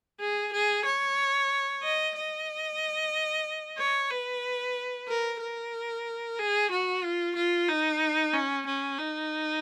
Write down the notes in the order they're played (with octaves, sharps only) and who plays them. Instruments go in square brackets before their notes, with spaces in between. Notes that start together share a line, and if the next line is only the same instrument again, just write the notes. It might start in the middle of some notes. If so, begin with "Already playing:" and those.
[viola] G#4
G#4
C#5
D#5
D#5
C#5
B4
A#4
A#4
G#4
F#4
F4
F4
D#4
C#4
C#4
D#4